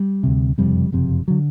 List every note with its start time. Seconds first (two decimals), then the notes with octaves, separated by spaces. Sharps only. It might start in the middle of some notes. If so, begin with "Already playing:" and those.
Already playing: G3
0.23 D2 C3
0.58 F#1 F2 C3 G3
0.92 F#1 F2 C3
1.28 D3 F#3